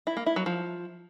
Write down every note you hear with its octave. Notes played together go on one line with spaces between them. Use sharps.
E4
A#3
E4
F#3
F3